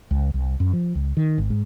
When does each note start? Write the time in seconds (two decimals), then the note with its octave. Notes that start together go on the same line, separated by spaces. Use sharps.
0.11 C#2
0.34 C2
0.60 F#2
0.73 F3
0.95 C#2
1.17 D#3
1.38 G#1
1.50 G#2